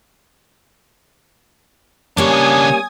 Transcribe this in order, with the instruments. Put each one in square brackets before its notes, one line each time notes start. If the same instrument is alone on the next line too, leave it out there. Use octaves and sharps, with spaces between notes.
[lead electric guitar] C#3 D4 [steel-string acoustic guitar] G3 A#3 C#4 [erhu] C#5 [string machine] G#5 D#6